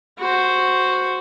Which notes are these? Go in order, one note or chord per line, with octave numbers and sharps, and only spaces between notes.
F#4 C5